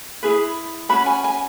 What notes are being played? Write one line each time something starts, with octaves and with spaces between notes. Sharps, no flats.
E4 G#4 B4
C#4 F#4 B4 B5
G#5
G#5